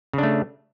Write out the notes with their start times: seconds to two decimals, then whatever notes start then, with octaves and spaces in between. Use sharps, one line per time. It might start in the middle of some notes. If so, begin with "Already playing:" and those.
0.13 C#3
0.18 D4
0.23 A3